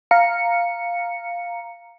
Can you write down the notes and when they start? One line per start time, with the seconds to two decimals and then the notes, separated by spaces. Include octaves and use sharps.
0.11 F5 A#5 C#7